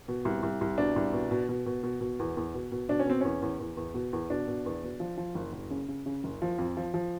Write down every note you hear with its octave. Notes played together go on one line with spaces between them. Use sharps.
B2
C2
C2
C2
B2 D4
C2
B2
B2
B2
B2
B2
B2
E2
E2
B2
B2
B2 D4
C#4
B2 C4
E2 C#4
E2
E2
E2
B2
E2
B2 D4
B2
E2
B2
F3
F3
F#1
F#1
C#3
C#3
C#3
F#1
F3
F2
F3
F3